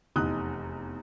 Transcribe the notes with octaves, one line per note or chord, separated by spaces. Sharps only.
F1 E2 D#4 D#6 F#6